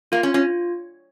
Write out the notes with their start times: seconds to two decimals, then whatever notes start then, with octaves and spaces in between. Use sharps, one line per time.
0.12 A#3 F4
0.23 C#4
0.34 C#4 F4